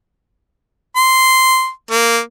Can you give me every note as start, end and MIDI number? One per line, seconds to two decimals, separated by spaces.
0.96 1.70 84
1.91 2.19 58